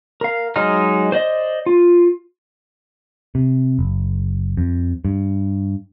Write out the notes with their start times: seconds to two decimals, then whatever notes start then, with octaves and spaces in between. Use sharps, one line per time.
0.21 A#4 F5
0.56 F#3 G#3 D#4 D#5 F6
1.12 C5 D5 D#5
1.66 F4
3.35 C3
3.79 F#1
4.57 F2
5.05 G2